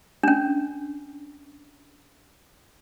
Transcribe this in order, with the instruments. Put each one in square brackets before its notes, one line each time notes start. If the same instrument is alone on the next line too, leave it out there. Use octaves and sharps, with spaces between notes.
[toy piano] C#4 D4